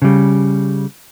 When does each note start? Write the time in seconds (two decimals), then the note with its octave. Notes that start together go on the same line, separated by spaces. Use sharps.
0.02 C#3 G3